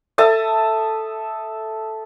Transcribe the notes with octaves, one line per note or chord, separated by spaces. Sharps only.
A4 E5 A5 D#6